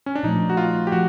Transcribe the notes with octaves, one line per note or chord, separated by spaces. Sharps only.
C#4
D4
A#2 F3 A3 D#4
F#4
F4
G4
F3 A3 F#4